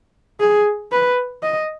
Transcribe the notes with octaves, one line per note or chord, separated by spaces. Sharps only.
G#4
B4
D#5